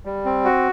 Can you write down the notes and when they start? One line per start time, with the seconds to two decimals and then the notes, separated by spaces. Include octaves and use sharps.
0.05 G3
0.25 C4
0.45 F#4